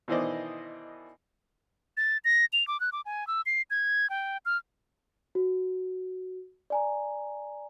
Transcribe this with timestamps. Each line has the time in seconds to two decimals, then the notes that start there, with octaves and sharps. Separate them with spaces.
0.08 B2 D#3 E3 C5 D5 D#5
1.97 A6
2.25 A#6
2.53 F7
2.68 D6
2.80 F#6
2.92 D6
3.05 G#5
3.27 E6
3.46 C7
3.70 G#6
4.10 G5
4.45 F6
5.35 F#4
6.70 D5 G#5 A#5